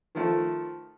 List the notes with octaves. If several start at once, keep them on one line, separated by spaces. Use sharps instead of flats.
D#3 F3 A3